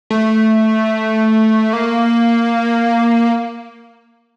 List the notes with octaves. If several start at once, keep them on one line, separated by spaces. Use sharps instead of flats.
A3
A#3